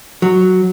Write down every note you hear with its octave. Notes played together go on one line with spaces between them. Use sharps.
F#3